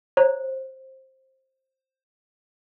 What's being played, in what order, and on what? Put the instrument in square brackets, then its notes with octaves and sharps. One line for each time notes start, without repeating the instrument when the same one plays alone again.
[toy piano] C5 [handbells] C#5 A#5